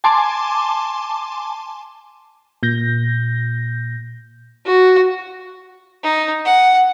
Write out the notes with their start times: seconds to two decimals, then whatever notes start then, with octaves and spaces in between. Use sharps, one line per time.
0.04 G#5 A5 C6 D6
2.63 A#2 G6 A#6
4.66 F#4
6.03 D#4
6.45 F#5